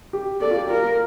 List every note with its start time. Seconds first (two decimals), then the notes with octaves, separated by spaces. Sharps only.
0.13 G4
0.41 A4 D5
0.51 F4
0.56 G4
0.70 F4 A#4